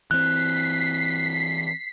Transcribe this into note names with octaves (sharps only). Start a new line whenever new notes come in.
E3 C4 F#6 B6 C7